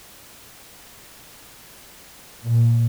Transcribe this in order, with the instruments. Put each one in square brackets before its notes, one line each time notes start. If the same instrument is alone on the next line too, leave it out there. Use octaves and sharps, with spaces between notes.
[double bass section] A#2